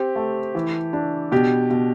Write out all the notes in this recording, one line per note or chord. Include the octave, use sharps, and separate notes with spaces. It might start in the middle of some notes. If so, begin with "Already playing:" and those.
Already playing: C4 G4
A3
E3
D4
B2 G4
B2